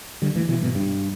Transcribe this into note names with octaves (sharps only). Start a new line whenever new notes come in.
D3 G3
E3 A3
B2 E3
G2 B2
G2